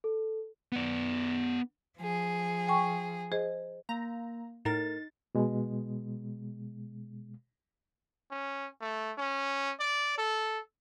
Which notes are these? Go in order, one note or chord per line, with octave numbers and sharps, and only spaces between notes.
A4
B3 D5
F3 G#4
G5 G#5 C#6
G#4 C5 D#5
A#3 A#5
A2 D#4 A#4 A6
B2 G#3
C#4
A3
C#4
D5
A4